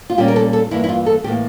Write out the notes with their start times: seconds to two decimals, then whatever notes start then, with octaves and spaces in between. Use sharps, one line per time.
0.10 F4
0.18 A#2 G3 A#3 C#4 G4
0.28 A#4
0.36 A4
0.53 A4
0.71 G2 E3 A#3 E4
0.84 E4
0.89 F4
1.06 A4
1.24 A2 E3 A#3 G4